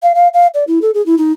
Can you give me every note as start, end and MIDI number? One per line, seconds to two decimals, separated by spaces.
0.03 0.12 77
0.15 0.28 77
0.34 0.47 77
0.54 0.64 74
0.67 0.79 64
0.82 0.91 69
0.94 1.04 68
1.06 1.15 64
1.18 1.32 63